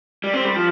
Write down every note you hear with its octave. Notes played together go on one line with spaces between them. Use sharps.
G3
C4
G3
F3